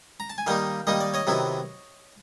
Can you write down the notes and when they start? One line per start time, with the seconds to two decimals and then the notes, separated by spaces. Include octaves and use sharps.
0.20 A#5
0.30 A5
0.38 G#5
0.47 D#3 G3 A#3 D#4 F5 G5
0.87 D#3 G3 A#3 D#4 D#5
1.00 D5
1.14 C#5 D#5
1.27 C3 D#3 F#3 B3 E4